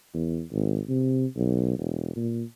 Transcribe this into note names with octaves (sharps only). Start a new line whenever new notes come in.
E2
G#1
C3
B1
E1
A#2